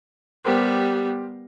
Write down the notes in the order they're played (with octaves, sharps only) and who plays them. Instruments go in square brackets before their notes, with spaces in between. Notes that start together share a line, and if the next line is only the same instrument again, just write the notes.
[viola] G3 B3 [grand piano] G4 A#4 C5